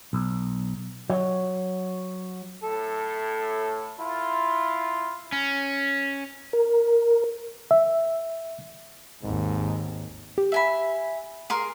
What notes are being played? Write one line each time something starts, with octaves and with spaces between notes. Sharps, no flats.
B1
F#3
A2 A4
E4 F4
C#4
A#4
E5
G#1 D#2 G#2
G4
E5 G#5 B5
G#4 A#4 C6